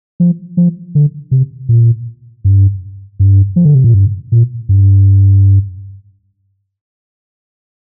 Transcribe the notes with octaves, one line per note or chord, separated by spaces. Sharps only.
F3
F3
D3
C3
A#2
G2
G2
F3
D3
C3
A#2
G2
A#2
G2